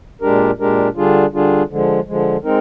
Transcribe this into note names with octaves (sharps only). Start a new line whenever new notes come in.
A#2 G#3 D4 G4 A#4
A#2 G#3 D4 G4 A#4
D3 G3 D4 F4 G#4
D3 G3 D4 F4 G#4
D3 F3 G#3
D3 F3 G#3
G#3 C4 D#4 A#4